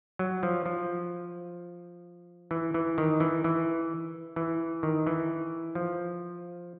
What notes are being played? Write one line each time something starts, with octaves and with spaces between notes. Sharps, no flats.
F#3
F3
F3
E3
E3
D#3
E3
E3
E3
D#3
E3
F3